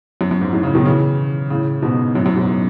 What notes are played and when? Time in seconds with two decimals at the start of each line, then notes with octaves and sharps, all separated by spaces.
0.21 F#2
0.31 F#2
0.41 G#2
0.53 F#2 A2
0.63 A2 C#3
0.75 B2 D#3
0.85 C#3 E3
1.50 A2 C#3
1.82 G#2 B2
2.15 F#2 A2
2.25 F#2 A2
2.36 G#2 B2